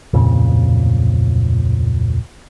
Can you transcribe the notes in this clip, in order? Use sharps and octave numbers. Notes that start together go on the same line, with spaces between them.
D1 F2 A#2 C#3